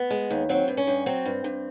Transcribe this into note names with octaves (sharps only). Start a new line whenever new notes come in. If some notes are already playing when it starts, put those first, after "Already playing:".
Already playing: B3
G#3
D#2
F#3 C4
G2
C#4
G2
F#3 C4
G2
G2